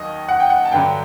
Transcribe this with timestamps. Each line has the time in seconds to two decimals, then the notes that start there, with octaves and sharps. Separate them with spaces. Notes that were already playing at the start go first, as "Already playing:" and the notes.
Already playing: D#2 D#3 F#3 D#5
0.29 F#5
0.40 G5
0.50 F#5
0.65 A5
0.72 G2 D3 F#3 G5